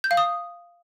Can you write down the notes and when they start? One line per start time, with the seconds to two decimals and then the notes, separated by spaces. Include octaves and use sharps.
0.04 G6
0.11 F5
0.17 D#6